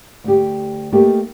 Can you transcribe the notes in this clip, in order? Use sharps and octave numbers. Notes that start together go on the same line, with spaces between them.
D2 G4
A3 A#3 D#4 G4